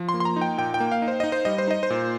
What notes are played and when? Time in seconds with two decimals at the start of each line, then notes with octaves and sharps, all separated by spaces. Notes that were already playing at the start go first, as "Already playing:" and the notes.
Already playing: F3
0.09 C6
0.14 A#3
0.20 C6
0.25 A#5
0.36 D#4
0.41 G5
0.58 A#2 G5
0.74 G5
0.80 A#3
0.92 F5
1.02 D#4
1.08 C5
1.20 D#4 D#5
1.32 C5
1.45 G3 D#5
1.58 C5
1.68 D#4 D#5
1.83 C5
1.90 A#2